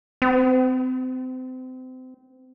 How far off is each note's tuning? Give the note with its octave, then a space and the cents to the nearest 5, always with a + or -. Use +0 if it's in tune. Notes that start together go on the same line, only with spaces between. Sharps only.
C4 -30